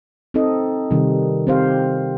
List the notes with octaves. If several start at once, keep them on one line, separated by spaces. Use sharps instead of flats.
C4 D#4 A4 D#5
C3 D#3 G3
C4 G4 C5 F5